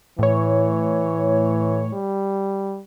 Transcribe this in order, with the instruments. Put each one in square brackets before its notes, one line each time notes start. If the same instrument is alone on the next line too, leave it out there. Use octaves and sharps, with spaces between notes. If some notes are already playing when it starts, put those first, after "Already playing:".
[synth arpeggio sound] A2 C#5 [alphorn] E3
[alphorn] G3